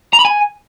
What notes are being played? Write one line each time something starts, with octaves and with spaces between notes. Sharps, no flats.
A#5
B5
G#5